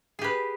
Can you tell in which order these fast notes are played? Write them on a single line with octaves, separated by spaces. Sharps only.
G#4 G4 B4